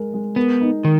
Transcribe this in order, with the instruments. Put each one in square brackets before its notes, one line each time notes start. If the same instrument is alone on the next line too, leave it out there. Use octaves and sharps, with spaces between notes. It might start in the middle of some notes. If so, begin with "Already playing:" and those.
Already playing: [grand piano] G#3 A#4
G#3
[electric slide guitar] B3 [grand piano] A#4
[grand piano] D#4
[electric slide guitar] D#3 [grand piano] A#4